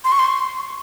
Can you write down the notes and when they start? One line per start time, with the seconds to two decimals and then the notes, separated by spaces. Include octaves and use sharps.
0.04 C6
0.12 C#6
0.19 C6